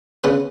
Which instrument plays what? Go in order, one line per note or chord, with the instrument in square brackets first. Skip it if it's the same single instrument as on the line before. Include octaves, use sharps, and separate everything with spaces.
[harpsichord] C#3 B3 B4